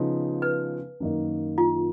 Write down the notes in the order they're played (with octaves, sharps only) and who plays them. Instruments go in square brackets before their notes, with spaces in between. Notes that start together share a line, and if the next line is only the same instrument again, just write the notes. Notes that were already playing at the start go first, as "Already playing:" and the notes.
Already playing: [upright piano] C#3 F3 B3 D#4
[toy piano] B4
[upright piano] F#2 D#3 A#3 D#4
[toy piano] F4